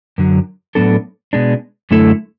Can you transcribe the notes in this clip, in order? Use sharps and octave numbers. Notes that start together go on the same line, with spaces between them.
F#2 D3 F#3
A2 F#3 B3 D4 A4
B2 G#3 D4
F#2 D3 A3 E4 A4